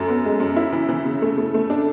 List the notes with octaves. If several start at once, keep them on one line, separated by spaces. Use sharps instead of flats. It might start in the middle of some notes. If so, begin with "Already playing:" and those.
Already playing: F#2 A3
B3
G#3
F#2
E4
E3
E3
C#3
A3
A3
A3
D4